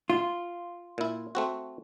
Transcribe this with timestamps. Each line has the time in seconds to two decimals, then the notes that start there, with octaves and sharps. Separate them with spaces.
0.10 F4
0.98 A#2 E4
1.35 A3 C4 F#4